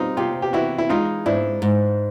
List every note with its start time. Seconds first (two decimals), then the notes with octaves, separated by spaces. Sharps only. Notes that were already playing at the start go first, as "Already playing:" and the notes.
Already playing: G3 C4 D#4 F4
0.17 C3 F4 G4
0.42 G4
0.53 E3 E4 F#4
0.78 E4
0.89 G#3 D#4 F4
1.26 G#2 D4 E4
1.62 G#2